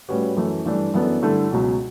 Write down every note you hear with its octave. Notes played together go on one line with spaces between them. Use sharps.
A2 G3 C#4 F#4 B4
F#2 E3 A3
G2 E3 A3 D4
F#2 E3 B3 D4 A4
G2 D3 A3 E4 A4
C#2 B2 F#3